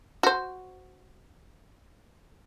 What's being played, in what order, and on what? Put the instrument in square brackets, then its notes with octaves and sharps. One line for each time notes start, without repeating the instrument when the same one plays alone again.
[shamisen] F#4 C5